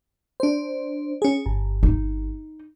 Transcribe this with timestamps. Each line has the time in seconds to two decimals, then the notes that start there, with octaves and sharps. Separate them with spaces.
0.40 D4 C5
1.22 C#4 G#4
1.46 G1
1.83 D#4